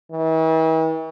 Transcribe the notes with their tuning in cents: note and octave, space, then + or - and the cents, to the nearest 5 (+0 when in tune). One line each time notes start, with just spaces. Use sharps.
E3 -45